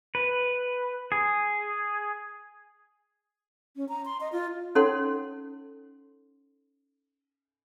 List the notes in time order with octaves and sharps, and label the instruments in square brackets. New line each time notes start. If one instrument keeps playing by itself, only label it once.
[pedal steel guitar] B4
G#4
[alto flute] C#4
A#5
C6
D#5
F4
[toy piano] C#4 D#4 A4 C#5 F#5 C6